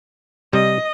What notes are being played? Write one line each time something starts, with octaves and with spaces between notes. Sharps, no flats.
C3 G3 D#5